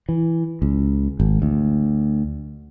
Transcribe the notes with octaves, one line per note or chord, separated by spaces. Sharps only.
E3
C#2
G#1
D2